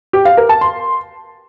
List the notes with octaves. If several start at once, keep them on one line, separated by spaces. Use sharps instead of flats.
G4
F5
A#4
A5
C6